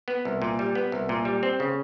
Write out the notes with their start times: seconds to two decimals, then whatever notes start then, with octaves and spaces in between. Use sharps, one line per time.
0.08 B3
0.25 C2
0.42 A#2
0.59 G3
0.75 B3
0.92 C2
1.09 A#2
1.25 G3
1.43 C4
1.60 C#3